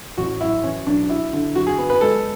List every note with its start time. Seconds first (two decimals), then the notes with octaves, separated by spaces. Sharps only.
0.18 A1 F#4
0.41 F#3 E4
0.64 E3 C#4
0.87 B1 D4
1.09 F#3 E4
1.33 D3
1.55 F#3 F#4
1.67 G#4
1.78 B3
1.90 B4
2.01 G#3 A4